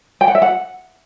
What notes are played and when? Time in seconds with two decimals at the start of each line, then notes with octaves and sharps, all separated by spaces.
0.21 G5
0.28 F#5
0.35 E5
0.42 F#5